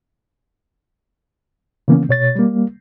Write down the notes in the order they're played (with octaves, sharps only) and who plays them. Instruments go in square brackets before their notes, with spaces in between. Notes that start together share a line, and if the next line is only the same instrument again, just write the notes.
[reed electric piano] C#3 E3 A#3 B3 C#4
B2 C#5 A6
G3 A#3